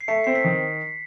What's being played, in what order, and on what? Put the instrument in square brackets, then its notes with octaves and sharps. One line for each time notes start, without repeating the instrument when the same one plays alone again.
[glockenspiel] C7
[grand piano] A3 [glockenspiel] B6 C#7
[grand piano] C4 [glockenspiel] C7
[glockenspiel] B6 C#7
[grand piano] D#3